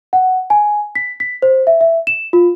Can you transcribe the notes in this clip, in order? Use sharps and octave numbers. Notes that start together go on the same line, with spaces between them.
F#5
G#5
B6
B6
C5
E5
E5
E7
F4